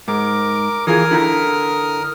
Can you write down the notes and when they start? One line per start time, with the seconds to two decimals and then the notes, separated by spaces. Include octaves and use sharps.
0.08 G#2 A#4 D6
0.87 E3 F4 G#4 A#4 D#6 F6
1.11 D3 E4 A#5